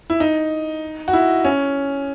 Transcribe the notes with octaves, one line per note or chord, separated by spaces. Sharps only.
E4
D#4
F#4
E4
C#4